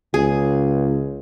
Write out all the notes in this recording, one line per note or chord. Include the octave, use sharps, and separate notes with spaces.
C#2 G#4